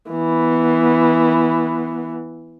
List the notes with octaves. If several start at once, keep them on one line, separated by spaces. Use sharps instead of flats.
E3 B3